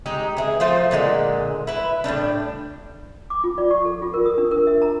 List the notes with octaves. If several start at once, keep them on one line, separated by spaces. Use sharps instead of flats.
G#3 D#4 G4
E3 G#4
F3 A3 F4 C5
A#2 D3 G3 G#3
E4 B4
A2 D#3 G3 D4
D6
F4
D5
C#6
A4
F4
A#4
D#6
D4
A#4
E5
A#5